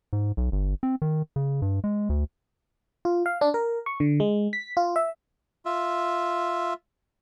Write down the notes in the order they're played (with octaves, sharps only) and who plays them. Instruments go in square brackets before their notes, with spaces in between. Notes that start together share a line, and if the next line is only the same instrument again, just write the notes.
[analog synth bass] G#2
B1
G1
C4
D#3
C#3
G2
G#3
D2
[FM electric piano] F4
F5
D4
A#4
C#6
D3
G#3
B6
F4
E5
[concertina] F4 E5